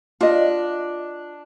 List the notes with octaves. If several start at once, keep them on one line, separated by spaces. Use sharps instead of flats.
D4 F4 D#5